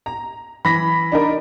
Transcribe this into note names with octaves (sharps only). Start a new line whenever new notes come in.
A#5
E3 B5 A#6 B6
D4 D#4 A#4